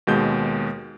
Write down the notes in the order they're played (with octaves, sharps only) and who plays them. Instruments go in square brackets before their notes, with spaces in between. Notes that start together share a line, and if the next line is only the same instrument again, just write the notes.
[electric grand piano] D#2 B2 G#3 G6